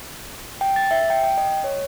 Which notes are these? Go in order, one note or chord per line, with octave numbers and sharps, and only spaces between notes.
G5
A6
E5
G5
G5
D#5
C#5